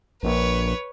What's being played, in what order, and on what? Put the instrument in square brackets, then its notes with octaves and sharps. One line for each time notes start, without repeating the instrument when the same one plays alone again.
[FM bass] A#1 [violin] B4 C#5